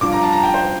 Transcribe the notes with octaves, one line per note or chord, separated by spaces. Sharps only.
G2 F3 D6
A#5
A5
A#5
G5
C5